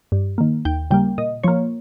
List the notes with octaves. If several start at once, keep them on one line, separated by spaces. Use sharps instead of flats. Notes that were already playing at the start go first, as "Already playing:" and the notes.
G2
D#3 A#3
D#2 G5
C#3 G3 A#3 G5
A#2 D#5
F3 A#3 C#5